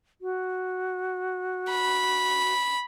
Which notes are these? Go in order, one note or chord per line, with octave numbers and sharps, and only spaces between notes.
F#4
B5